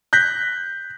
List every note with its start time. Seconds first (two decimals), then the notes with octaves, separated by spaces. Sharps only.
0.13 F#6 G6 A#6 B6